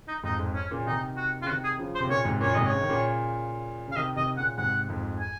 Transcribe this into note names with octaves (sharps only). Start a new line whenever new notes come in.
D#4
F2 G#2 D#4
F2 G#2
C#4
A#2 C#3
C3 D#3 D#4
F#4
C#3 F4
C3 D#3 F#4
G#4
C#3 F3
C5
C3
A#2 C#3 C#5
G#2 C3
F#2 A#2 C#5
G#2 C3 D#5
C#5
C#3
D#3
A#2 C#3
C#3
F5
C3 D#3 D#5
C3 D#3 D#5
A#2 C#3 F#5
G#2 C3 F#5
F2 G#2
G#5